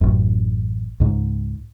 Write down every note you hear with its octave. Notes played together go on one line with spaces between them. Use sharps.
A1 F#2
C#2 G#2